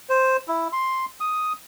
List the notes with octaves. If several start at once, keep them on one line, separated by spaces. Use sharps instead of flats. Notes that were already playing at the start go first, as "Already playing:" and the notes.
C5
E4
C6
D#6